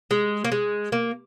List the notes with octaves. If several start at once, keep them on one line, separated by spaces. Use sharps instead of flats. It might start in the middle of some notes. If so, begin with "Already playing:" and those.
G#3
A#3
G#3
A#3